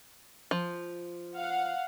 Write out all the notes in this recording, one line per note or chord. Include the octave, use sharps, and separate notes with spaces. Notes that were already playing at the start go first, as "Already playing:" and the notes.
F3
F5 F#5